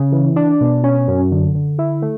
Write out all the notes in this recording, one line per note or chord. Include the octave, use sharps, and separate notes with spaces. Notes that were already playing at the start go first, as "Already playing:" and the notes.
Already playing: C#3
E3
D4
B2
C#4
F#2
D3
D3
E4
A3